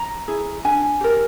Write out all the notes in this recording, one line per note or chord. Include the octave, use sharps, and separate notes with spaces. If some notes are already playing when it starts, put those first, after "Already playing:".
Already playing: A#5
E4 G#4
D4 G#5
G4 A#4